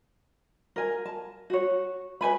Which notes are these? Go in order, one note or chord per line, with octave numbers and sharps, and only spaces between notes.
A#4 G#5
A5
F#4 C#5
B4 C5 G#5 B5